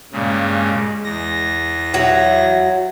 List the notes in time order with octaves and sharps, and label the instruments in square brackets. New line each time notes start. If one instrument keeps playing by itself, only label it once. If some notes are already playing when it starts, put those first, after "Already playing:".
[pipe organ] G2 A#2 C#3 [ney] G#3
[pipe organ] E2 A#6
[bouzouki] F#3 [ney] E5